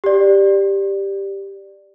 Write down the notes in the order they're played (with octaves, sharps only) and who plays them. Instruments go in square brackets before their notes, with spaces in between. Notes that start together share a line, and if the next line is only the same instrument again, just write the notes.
[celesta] G4 D5